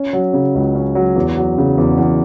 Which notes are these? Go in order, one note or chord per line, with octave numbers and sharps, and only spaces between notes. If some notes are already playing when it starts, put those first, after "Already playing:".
Already playing: C#4
F#3
C#3
C#2
C#4
F#3
E2
F#3
C#3
E2
E2